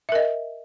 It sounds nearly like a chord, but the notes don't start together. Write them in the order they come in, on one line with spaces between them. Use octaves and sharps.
E5 A#4 D#5